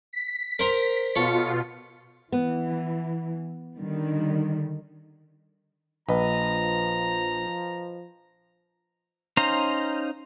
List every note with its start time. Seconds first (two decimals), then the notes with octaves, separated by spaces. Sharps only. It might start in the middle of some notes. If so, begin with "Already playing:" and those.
0.13 B6
0.59 A#4 C5 A#5
1.16 B2 F4 A4 C#5
2.32 E3 B3
3.77 D3 D#3 G3
6.09 A#1 F3 B4 D#5 A#5
9.37 C#4 D#4 C5 F5 A#5